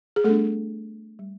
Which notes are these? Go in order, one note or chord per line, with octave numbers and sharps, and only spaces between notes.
G#4
G3 A3 B3 D4 A4
G3